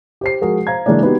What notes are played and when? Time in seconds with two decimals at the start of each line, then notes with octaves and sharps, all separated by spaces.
0.21 G4 C5 C7
0.41 F3 G#3 F#4 G#4 A#4
0.67 C5 F5 A#5 G#6
0.86 C#3 E3 G#3 A#3 C#4 D4
1.03 B3 D4 D#4 F#4 G4 B4